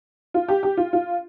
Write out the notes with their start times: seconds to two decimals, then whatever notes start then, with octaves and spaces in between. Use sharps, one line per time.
0.34 F4
0.48 G4
0.63 G4
0.77 F4
0.93 F4